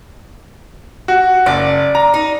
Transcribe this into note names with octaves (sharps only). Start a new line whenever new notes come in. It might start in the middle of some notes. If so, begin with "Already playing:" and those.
F#4
F#1 D5
A#5
D#4